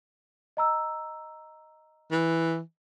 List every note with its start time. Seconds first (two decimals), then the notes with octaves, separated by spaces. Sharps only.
0.57 D#5 A#5 E6
2.12 E3